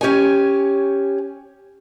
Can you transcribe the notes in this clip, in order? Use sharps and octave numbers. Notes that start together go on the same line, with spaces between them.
C#4 G4 C#5 G#5